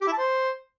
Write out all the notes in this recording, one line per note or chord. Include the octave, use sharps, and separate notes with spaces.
G4
E4
A5
C5